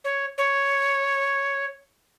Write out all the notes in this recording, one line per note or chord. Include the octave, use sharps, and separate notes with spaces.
C#5
C#5